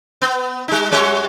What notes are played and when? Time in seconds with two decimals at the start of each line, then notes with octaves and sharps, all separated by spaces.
0.22 B3
0.68 G3 D#4
0.91 F#2 G3 C#5